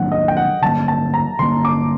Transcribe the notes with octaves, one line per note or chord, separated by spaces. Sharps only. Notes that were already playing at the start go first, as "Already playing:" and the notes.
Already playing: D#3 F#3 A#3 D4 F#5
D#5
G5
F#5
D3 F#3 A#3 A5
A5
A#5
D3 F#3 A#3 C6
D6